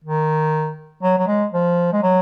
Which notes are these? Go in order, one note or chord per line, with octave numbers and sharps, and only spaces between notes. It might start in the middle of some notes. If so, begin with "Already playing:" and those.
D#3
F#3
F#3
G#3
F3
G#3
F#3